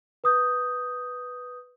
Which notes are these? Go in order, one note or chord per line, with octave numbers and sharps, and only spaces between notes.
B4 D#6 G6